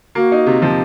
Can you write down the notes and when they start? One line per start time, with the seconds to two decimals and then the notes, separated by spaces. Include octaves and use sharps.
0.15 A#3 F#4
0.32 D#4
0.46 C3
0.62 F3 G4